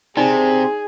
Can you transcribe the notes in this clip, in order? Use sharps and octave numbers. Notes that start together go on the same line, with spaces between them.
C3 D#4 G#4 D5 G#5